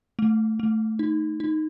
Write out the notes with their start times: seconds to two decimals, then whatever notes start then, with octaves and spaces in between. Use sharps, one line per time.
0.19 A3
0.59 A3
0.99 D#4
1.40 D#4